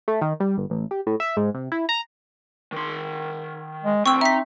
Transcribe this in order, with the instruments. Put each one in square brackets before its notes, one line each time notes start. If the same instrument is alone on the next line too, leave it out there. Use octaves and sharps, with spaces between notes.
[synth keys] A3
D#3
G3
G1
A1
G4
A2
E5
G#2
C3
E4
A#5
[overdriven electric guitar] D#3 C6
[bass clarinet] G#3
[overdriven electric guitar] D2 G5 [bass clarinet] C4 [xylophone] C#6 E6
[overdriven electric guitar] D#4 A#5 [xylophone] E5 B6